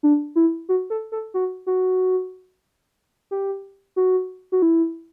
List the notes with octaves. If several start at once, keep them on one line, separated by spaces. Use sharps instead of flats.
D4
E4
F#4
A4
A4
F#4
F#4
G4
F#4
F#4
E4